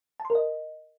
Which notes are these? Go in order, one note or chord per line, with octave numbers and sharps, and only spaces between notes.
A5
C6
A#4
D#5